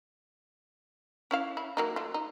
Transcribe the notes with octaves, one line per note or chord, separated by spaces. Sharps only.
C#4 E4 F5
E4
F#3 A#3 D#4
A3 F4
D#4